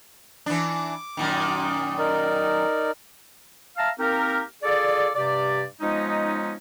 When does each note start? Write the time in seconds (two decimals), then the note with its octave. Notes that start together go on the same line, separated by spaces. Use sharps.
0.46 E3 D4
0.72 D6
1.17 F#2 A#2 D#3
1.98 D#4 A#4 D5
3.77 E5 F5 A5 A#5 F6
3.99 A#3 C4 D#4 G4 A#4
4.63 F4 G#4 A4 D5
5.15 G2 C3 G4 D5
5.81 F3 G#3 B3 C#4 D#4